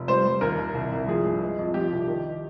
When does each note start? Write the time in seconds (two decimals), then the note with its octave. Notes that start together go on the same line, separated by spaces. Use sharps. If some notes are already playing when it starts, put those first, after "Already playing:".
Already playing: F1
0.08 G3 C5
0.25 G3
0.41 D#2 A#4
0.59 D#2
0.74 C2
0.92 C2
1.08 F3 G#4
1.25 G2
1.42 G#3
1.59 F2
1.74 F3 G4
1.92 C2
2.07 D#3